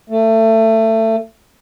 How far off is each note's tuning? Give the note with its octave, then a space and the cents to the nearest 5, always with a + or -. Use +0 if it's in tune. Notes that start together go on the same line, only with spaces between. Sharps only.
A3 +25